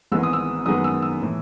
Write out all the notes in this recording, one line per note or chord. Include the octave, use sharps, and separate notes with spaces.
G#1 G#2 E3 G#3 B3 E6
D#6
E6
F#2 D#3 G#3 B3 D#6
E6
E6
A2 E3